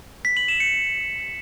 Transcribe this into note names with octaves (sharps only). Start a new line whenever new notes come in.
B6
F#7
E7
C#7